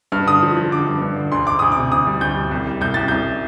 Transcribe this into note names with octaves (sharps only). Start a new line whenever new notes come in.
G2 F6
D3 D#6
F3
F3
D3 D6
G2
G2
D3
D2 C6
D2 D6
D2 D#6
C3 D6
D2 D#6
G3
D2 G6
G3
C2
G3
C2 G6
C2 A6
C2 G6